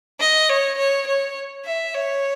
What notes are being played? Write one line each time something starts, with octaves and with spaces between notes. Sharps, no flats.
D#5
C#5
C#5
C#5
E5
C#5